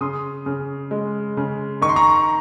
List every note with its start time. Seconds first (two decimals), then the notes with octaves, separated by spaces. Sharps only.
0.01 C#3 C6 D#6
0.46 C#3
0.91 G#3
1.37 C#3
1.82 D#3 C#6
1.89 C6
1.96 A#5 C#6